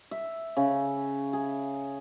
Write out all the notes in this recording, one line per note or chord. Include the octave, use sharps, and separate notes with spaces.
E5
C#3
G#4